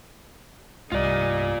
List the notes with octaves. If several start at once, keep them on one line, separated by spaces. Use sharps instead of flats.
C2 G2 G3 F4 D5 D#5